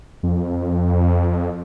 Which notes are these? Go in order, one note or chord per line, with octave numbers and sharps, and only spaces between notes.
F2